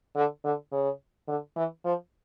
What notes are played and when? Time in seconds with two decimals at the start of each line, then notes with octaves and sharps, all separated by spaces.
0.16 D3
0.44 D3
0.72 C#3
1.28 D3
1.56 E3
1.84 F3